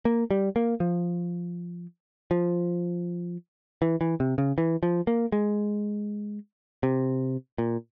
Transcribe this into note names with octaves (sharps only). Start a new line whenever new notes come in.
A#3
G3
A#3
F3
F3
E3
E3
C3
C#3
E3
F3
A#3
G#3
C3
A#2